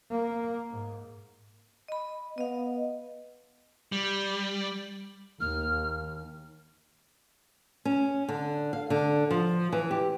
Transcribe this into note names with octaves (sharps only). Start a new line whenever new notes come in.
A#3
G#2
D#5 B5
B3 D#5 F5
G3
D#2 F6
C#4
D3
F5
D3
F3
E3
G4